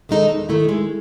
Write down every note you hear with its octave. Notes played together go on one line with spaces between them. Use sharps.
D#3 G#3 D#4 A4
E2
D#3 A3 E4
G#3